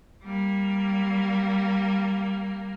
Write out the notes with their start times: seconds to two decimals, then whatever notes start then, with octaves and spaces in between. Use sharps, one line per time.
0.23 G3 A#3